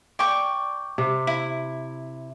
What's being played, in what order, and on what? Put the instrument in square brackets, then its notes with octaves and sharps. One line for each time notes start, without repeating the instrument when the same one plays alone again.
[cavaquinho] D5 G5 C#6
[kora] C3
[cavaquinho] E4